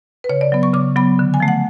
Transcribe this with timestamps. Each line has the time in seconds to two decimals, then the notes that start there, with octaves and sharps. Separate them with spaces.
0.24 B4
0.29 C#3 C#5
0.41 D5
0.52 F#3 B3
0.63 C#6
0.74 C#3 D6
0.96 F#3 B3 B5
1.19 D3
1.34 G#5
1.40 F3 A3
1.48 F#5